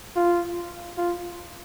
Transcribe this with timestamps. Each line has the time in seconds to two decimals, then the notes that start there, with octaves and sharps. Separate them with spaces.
0.16 F4
0.98 F4